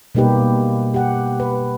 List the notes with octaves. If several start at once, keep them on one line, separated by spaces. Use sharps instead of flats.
B2 G3 A#3 D#4 G4 B4
G4 F#5
B4